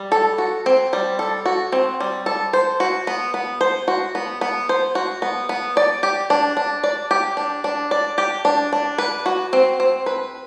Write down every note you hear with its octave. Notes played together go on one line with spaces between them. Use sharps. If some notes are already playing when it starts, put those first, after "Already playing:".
Already playing: G3
A4
F#4
C4
G3
A4
F#4
C4
G3
A4
C5
F#4
B3
B3
C5
F#4
B3
B3
C5
F#4
B3
B3
D5
G4
D4
D4
D5
G4
D4
D4
D5
G4
D4
D4
B4
F#4
C4
C4
B4